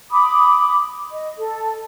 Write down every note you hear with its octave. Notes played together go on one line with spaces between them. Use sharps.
B5 D6 D#6
D#5
A4